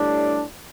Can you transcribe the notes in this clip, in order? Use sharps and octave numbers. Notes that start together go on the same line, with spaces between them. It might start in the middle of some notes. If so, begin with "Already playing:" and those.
Already playing: A2 G3 D4